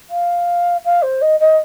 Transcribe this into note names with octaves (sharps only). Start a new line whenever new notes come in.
F5
F5
C5
D#5
D#5